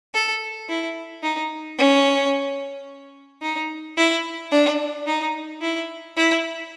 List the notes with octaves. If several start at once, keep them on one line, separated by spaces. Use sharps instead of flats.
A4
E4
D#4
C#4
D#4
E4
D4
D#4
E4
E4